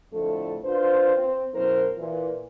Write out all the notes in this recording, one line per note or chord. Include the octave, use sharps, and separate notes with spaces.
F2 A2 D3 A3 A4
D4 F4 B4 C5
C4
F#2 B2 E4 A#4 C5
A#2 E3